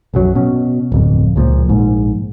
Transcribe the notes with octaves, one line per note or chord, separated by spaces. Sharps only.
B1 F#2 F#3
B2 C#4
D1 F2
C#2 A#2 F3
A#1 G#2